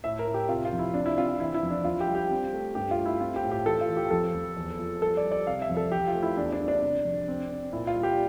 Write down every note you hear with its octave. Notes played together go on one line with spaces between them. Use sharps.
A2 E5
A#4
A2
G4
C3 F4
F4
F2
E4
C3 D4
E4
C4 F4
F4
E3 E4
E4
F2
D4
F2 F4
G4
G3
G4
C4
A3
G2 G4
F4
A3
E4
C4 F4
G4
A2
G4
E3 A4
F4
E3
G4
F2 A4
F2
E2
F3
G3 A4
D5
G3
D5
C3 F5
E5
F2
A4
E3 G4
F4
A3
E4
E2 D4
D4
G3
D4
C3
F2
C4
C4
A#2 E4
F4
G3
G4